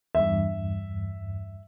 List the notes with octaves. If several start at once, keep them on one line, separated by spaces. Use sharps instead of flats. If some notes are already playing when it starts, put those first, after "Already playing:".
E2 G2 E5